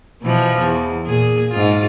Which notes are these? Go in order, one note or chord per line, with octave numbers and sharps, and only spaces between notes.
B2 E3 F3
E2
A#2 G#4
G#2 F4